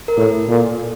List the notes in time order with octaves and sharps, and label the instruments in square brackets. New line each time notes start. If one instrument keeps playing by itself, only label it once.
[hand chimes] A#4
[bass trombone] A2 [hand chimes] A4
[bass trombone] A#2